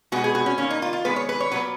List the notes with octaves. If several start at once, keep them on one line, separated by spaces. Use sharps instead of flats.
B2 G#3 B3 F#4
G#4
F#4
C#4
D#3 A#3 C#4
D#4
F4
F4
D#3 G#3 B3 B4
C#5
B4
C#5
A#2 F#3 B3 B4